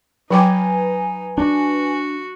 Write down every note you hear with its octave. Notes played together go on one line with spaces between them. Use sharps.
F#3 D#4 B4 G5 G#5 D6
D4 F#4